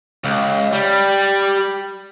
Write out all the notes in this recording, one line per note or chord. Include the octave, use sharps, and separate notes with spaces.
C#2
G3